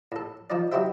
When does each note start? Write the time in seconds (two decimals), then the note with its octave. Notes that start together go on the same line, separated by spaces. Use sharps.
0.12 A2 A4
0.50 F3 D#4 D5
0.72 F#3 D#4 E4 G4 C5 E5